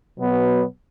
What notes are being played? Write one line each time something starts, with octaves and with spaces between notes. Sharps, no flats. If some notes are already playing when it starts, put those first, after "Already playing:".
B2 F#3 B3